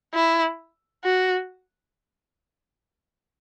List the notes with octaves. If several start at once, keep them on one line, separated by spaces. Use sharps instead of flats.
E4
F#4